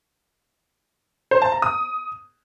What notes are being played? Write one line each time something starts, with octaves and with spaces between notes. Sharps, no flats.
C5
A5
A#5
D#6